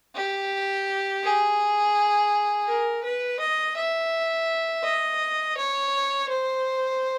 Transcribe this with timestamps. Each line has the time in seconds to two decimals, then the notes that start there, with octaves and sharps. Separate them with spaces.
0.15 G4
1.24 G#4
2.68 A#4
3.04 B4
3.40 D#5
3.77 E5
4.84 D#5
5.58 C#5
6.29 C5